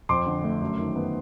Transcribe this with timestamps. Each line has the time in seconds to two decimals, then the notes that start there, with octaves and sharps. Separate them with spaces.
0.09 F2 C6 D6
0.26 D3
0.44 A3
0.61 F#2
0.79 D#3
0.96 B3